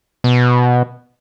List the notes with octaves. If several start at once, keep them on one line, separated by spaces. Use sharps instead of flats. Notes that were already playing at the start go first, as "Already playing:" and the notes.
B2